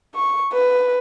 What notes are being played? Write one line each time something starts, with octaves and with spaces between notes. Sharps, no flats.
C#6
B4